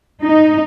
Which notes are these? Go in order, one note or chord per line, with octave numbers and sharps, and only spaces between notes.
D#4